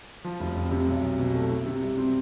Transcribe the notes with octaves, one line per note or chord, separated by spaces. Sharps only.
F3
F1
F2
C3
B1
B1
B2
A3
E4
C3
G3
C4